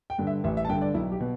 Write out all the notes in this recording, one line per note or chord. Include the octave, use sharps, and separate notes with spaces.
G5
G2 D3
E5
A1 E5
E5
A5
G2 D3 G5
D5
B1 E4
G4
B2